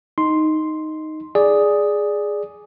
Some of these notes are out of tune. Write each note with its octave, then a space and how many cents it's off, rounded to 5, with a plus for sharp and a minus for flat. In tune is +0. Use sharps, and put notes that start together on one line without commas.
D#4 +0 C6 +0
G#4 +0 D5 +0